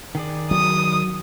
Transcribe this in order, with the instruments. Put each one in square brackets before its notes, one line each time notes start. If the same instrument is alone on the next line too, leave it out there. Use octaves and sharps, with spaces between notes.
[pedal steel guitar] D#3 G#4 D5
[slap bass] F#3 [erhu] D#6